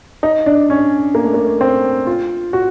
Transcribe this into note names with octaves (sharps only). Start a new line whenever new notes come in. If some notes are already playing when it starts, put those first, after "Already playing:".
D#4
D4
C#4
A#3
A3
A#3
C4
F4
F#4